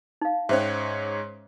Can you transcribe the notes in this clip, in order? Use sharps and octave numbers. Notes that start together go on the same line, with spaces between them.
D#4 F5
G#2 G#3 C#4 C5 C#5 E5